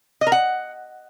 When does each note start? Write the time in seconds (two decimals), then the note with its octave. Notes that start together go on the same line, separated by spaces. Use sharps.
0.21 D#5
0.27 A#4
0.32 F#5